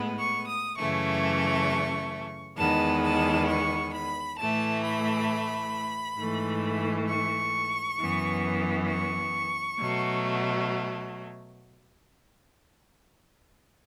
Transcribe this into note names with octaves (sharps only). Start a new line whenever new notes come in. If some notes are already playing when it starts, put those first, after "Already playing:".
Already playing: A2 G#3 B3
C#6
D#6
F#2 C#3 E3 A3 C#6
E2 D#3 G#3 B3 A5
A5
C#6
B5
A2 E3 A3 A5
B5
G#2 E3 A3
C#6
F#2 E3 B3
C#6
B2 F#3 A3